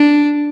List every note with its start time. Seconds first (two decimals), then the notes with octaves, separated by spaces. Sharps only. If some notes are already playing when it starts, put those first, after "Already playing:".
Already playing: D4